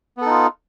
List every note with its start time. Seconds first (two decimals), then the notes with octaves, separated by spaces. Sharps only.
0.17 B3
0.22 A4
0.26 D#4
0.30 F4